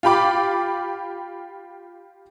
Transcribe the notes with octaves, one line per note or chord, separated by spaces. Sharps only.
F4 G4 G5 B5 D6